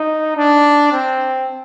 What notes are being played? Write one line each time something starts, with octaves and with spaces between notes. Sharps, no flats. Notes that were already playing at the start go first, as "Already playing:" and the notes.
Already playing: D#4
D4
C4